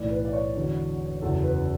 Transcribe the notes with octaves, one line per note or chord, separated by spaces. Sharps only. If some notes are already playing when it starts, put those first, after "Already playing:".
Already playing: B1 A2 E3 D5
B4
D5
C#5
E1 E2 D3 F#3
F#1 E2 C#3 F#3 A4
B4